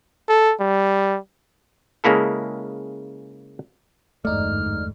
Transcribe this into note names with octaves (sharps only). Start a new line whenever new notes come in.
A4
G3
C#3 G#3 A#3 E4 A4
G1 E2 G#2 A3 D#4 D5 F6